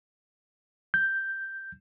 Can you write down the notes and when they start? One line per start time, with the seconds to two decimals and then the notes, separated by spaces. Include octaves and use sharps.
0.94 G6